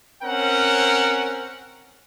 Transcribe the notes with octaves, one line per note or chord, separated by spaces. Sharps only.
C4 C#4 A#4 F#5